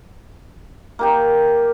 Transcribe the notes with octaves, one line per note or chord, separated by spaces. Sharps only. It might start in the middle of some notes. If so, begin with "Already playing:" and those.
A#3 G4 G5